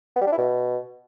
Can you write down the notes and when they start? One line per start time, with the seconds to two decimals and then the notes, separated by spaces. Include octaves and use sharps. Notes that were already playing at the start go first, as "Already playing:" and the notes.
0.16 B3
0.21 G3
0.27 D4
0.32 E4
0.38 B2